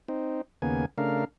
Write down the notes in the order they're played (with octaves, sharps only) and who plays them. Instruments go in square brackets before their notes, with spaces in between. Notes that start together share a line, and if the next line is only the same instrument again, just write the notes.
[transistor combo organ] C4 D#4
D#2 C#3 A#3 B3 G#5
C#3 A3 D4 A#4 F5